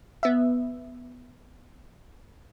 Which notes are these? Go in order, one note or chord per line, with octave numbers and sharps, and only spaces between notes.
B3 E5